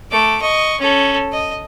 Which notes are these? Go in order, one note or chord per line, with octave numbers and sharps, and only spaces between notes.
A3 D6
D#5 C#6
C#4 A4
D#5